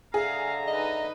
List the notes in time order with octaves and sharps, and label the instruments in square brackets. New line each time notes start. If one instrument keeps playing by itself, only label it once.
[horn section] D3 E5 A#5 [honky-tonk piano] G#4 [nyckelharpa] F5
[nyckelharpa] D#4 B4 [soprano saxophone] D#5